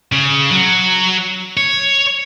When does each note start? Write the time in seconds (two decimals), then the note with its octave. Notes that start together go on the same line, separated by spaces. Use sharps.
0.12 C#3
0.51 F#3
1.57 C#5